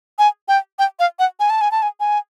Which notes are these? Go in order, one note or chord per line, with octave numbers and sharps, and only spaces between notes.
G#5
G5
G5
F5
F#5
G#5
A5
G#5
A5
G#5
G#5